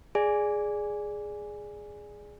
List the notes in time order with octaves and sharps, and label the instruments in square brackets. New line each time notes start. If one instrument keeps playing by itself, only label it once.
[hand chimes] G#4 D5 G#5